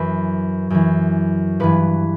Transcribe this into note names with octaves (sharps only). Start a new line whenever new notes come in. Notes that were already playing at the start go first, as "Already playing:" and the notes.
Already playing: F#2 E3 B4
F#2 E3
G2 E3 B4